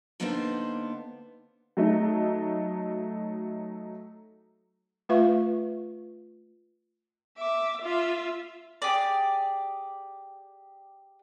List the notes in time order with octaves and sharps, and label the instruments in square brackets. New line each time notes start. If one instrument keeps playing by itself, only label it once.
[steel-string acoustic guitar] D3 A#3 B3 D4 D#4 C5
[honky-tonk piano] F#3 A3 D#4
[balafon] A3 F4 B4 E5 F5 C#6
[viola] E5 D6
F4 E5
[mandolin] G4 G#4 D5